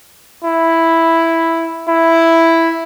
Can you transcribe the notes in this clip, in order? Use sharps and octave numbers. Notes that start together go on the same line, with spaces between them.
E4
E4